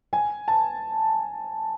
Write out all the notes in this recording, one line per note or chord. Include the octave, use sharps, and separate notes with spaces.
G#5
A5